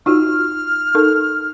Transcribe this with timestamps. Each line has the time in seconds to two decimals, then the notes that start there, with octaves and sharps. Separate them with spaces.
0.06 D#4 F4 F#4 F6
0.95 D#4 A4 A#4